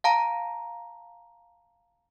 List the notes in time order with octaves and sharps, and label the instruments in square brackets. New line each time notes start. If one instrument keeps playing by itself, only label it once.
[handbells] F5 A5 A#5